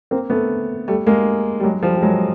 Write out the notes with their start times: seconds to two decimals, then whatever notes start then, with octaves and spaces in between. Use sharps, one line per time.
0.11 A#3 C4
0.30 A3 B3
0.88 G3 A3
1.06 G#3 A#3
1.60 G3
1.64 F#3 G#3
1.83 F3 G3
1.95 G3
2.02 F#3 G#3